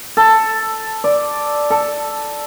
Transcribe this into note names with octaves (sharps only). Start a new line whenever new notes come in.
A4
D5
A4